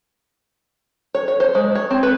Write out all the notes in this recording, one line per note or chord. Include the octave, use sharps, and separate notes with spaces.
C#5
C#5
C5
G#3
C#5
C4
B4